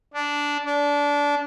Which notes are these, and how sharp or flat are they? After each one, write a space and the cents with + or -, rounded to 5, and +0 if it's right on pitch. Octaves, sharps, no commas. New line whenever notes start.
D4 -10
D4 -20